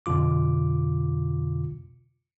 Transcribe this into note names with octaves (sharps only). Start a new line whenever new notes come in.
F2 B2 D3 F4 D6